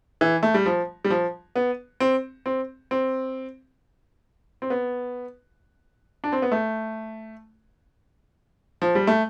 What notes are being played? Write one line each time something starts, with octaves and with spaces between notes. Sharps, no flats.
E3
A3
G3
F3
G3
F3
B3
C4
C4
C4
C4
B3
D4
C4
B3
A3
F3
G3
A3